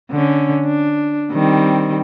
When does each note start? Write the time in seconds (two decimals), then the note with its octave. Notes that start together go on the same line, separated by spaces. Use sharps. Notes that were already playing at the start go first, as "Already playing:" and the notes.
0.11 D3 C#4
0.66 D4
1.32 D#3 G3 C4